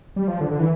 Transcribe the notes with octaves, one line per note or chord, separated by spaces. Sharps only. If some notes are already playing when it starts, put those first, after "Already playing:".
G3
F3
D3
D3
E3